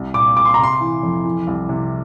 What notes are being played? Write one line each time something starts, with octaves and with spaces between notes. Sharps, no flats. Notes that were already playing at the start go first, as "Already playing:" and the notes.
Already playing: C2
A#2 D6
A#2 D6
C6
A#5
C3 C6
E3
F2
E3
C2
C3